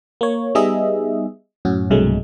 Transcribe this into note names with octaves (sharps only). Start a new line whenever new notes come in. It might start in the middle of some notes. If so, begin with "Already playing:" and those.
A#3 C#5
G3 B3 D#4 G#4 D#5 E5
F#2 A2 C#4 F#4
B1 G2 C3 F#3 G#3 A3